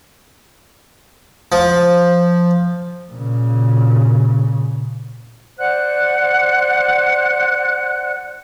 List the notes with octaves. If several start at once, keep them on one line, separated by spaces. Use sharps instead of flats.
F3
A#2 C#3
C5 D5 F#5 F#6